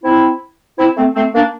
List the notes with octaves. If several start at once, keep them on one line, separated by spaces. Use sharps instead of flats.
C4 E4
C4 E4
A3 C4
A3 C4
A#3 D4